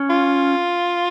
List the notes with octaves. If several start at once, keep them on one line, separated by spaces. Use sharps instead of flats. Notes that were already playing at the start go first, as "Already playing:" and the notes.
Already playing: C#4
F4